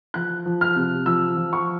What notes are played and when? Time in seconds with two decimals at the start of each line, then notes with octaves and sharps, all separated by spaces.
0.14 F3 F#6
0.46 F3
0.61 F6
0.76 C3
1.06 F3 E6
1.37 F3
1.53 C#6